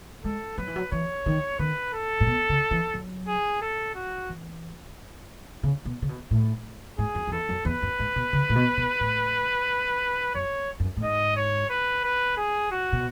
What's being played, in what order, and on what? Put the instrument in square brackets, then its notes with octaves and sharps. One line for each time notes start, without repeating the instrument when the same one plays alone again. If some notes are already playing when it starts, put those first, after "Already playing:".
[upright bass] G#3 [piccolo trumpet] A4
[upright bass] F#3 [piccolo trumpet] B4
[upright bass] E3
F#3
[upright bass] E3 [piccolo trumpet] C#5
[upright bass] D#3
[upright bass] D#3 [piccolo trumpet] B4
[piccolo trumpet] A4
[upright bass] A2
B2
C#3
E3
F#3
[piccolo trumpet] G#4
A4
F#4
[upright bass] E3
C#3
B2
C#3
B2
A2
[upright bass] G#2 [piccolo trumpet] G#4
[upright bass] F#2
F#2
[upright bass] E2 [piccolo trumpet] A4
[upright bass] F#2
[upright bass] E2 [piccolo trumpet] B4
[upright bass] F#2
G#2
B2
C#3
A2
B2
B2
A2
[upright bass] F#2 [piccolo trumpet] C#5
[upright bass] F#2
A2
[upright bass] G#2 [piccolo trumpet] D#5
[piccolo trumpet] C#5
B4
B4
G#4
F#4
[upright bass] B2